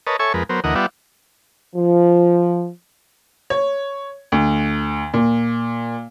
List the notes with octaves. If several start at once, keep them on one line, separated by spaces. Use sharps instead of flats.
A#4 B4 C#5 D#5 A5
A4 C#5 E5 G#5 C#6
F2 G#3 A#4 B4
F#3 B3 A#4 C5
D2 E3 A#4 D#5 F#5
G3 B3 F4 D5 E5 F#5
F3
C#5
D2
A#2